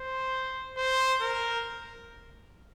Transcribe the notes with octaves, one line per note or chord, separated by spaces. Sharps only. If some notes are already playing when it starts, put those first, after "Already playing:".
Already playing: C5
C5
A#4